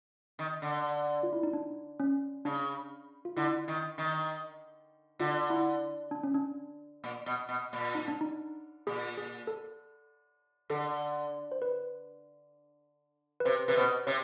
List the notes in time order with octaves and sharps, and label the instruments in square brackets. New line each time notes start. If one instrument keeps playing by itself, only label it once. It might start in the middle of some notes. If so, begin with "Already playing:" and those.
[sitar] D#3
D3
[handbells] F4
E4
D#4
D4
C#4
[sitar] C#3 [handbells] D4
[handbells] F4
[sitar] D3 [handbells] E4
[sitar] D#3
D#3
[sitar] D3 [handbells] F4
[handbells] E4
D4
C#4
D4
[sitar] A#2
B2
B2
A#2
[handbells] D#4
D4
D#4
[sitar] A#2 [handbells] G#4
[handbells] G#4
A4
[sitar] D3 [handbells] A4
[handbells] C5
B4
B4
[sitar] C3 [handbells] C5
[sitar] C3 [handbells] B4
[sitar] B2 [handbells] C5
[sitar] C3 [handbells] C#5